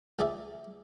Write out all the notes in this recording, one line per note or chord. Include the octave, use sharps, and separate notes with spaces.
C#2 D#4 G#4 D5 E5